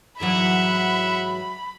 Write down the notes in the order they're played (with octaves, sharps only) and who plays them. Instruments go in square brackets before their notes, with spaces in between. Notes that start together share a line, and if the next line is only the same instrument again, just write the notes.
[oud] G#2 E3 F#3 [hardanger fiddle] E5 F#5 [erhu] B5